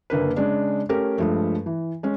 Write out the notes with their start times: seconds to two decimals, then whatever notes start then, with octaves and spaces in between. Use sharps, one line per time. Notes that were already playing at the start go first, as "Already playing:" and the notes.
0.10 F#1 D3 A#3 B4
0.36 C#3 G#3 D4
0.89 A3 C#4 G4 A#4
1.18 G2 F3 G#3 A3
1.66 E3
2.03 G#3 C#4